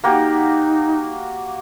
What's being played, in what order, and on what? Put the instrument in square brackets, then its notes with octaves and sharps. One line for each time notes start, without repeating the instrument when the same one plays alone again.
[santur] A#3 F#4 G4 [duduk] D#4